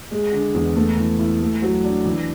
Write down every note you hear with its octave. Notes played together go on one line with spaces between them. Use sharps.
G#3
D3
E2
A3
E3
E4
A3
F#3
D4
E3